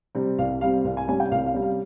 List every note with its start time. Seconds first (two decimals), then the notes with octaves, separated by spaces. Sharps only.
0.15 C3 G3 C4
0.38 C2 F5
0.61 C3 G3 C4 F5
0.84 C2 F5
0.97 G#5
1.08 C3 G3 C#4 G#5
1.20 G5
1.31 C2 F5
1.46 F5
1.54 C3 G3 C#4
1.62 F5